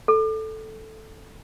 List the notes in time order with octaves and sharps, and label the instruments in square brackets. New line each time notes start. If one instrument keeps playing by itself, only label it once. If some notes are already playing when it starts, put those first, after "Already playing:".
[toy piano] A4